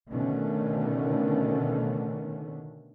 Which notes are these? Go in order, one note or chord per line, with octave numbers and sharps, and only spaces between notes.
B2 D3 D#3 A3 C#4